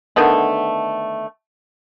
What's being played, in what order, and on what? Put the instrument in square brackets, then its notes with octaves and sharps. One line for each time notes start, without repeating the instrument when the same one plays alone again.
[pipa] D3 D#3 A3 B3